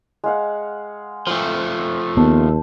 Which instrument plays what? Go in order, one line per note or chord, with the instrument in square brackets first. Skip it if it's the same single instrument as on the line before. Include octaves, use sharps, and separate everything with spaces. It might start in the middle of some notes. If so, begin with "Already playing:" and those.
[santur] G#3 F5 F#5
[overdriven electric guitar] F3 A3 [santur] C5 G5
[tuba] D#2 [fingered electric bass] B3 [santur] A5